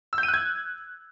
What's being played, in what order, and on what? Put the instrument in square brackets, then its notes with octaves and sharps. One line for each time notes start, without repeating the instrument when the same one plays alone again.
[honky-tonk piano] E6
G6
D#7
F#6
G#6